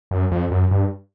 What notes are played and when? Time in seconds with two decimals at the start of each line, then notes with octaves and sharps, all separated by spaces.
0.11 F#2
0.31 F2
0.51 F#2
0.71 G2